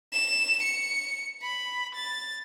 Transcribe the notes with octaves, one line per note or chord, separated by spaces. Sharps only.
E7
C#7
B5
A6